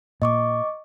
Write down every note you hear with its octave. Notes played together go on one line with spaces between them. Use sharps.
A#2 D#5 C#6 D6